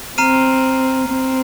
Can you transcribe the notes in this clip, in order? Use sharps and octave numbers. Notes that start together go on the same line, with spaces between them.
C4 A#5 F6 C7 D#7
C4